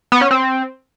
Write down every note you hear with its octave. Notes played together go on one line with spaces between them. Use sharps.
B3
C#4
C4